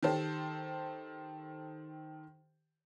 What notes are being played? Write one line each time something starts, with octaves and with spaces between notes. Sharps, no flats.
D#3 G4 A4 C5